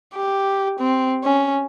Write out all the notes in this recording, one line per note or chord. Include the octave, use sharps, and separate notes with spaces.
G4
C4
C#4